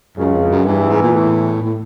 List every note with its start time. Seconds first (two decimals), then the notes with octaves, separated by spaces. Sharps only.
0.17 C#2 F#2 C#3
0.34 F2
0.50 F#2
0.66 E2 G2 E3
0.89 G#2
1.02 A#2
1.14 A2
1.62 A2